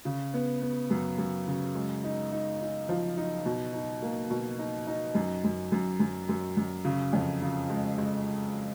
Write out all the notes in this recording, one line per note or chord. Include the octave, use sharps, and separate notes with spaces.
C#3
B3
B3
F#2
F#2
C#3
G#3
D#4
D#4
D#4
F3
D#4
B2
D#4
A#3
B2
D#4
D#4
F#2
F#2
F#2
F#2
F#2
F#2
C#3
F2
C#3
G#3
G#3